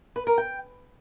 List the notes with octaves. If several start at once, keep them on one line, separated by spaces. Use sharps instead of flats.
B4
A#4
G5